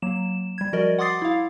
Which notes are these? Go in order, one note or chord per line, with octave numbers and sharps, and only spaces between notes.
F#3 A#3 E7
G3 G#6
F3 F#4 A#4 D5 D#5
F#5 C6 D6 D#6 A6 C7
E4 F5